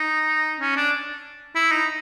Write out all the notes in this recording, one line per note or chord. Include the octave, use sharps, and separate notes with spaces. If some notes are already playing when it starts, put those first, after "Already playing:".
Already playing: D#4
C#4
D4
E4
D#4